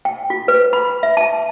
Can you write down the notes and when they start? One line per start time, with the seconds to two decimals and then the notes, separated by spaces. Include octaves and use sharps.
0.05 G5
0.30 F4
0.48 B4
0.73 B5
1.03 E5
1.17 A5